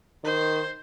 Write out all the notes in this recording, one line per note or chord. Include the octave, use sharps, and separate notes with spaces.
D#3 C5